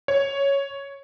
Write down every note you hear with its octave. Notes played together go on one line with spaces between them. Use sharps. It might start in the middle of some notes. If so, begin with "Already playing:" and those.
C#5